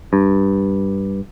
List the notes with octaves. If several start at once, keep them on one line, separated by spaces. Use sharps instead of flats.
G2